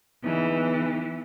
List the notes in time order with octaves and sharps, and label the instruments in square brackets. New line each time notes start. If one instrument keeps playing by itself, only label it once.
[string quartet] E3 [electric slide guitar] B3 D#4 G#4